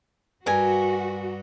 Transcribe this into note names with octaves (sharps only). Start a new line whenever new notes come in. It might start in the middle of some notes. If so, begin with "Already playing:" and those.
G2 F#4 A#4 G#5